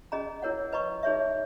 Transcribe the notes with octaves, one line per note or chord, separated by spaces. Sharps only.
C#4 G#4 D#5 A#5
E4 A#4 C#5 F#5
B4 D#5 A#5 C#6
D#4 G#4 C#5 E5